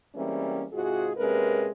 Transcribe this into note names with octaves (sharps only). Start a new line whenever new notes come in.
E3 G3 G#3 A#3 C4 C#4
G#2 C3 F4 F#4 G#4
C3 G#3 A#3 C#4 A#4 B4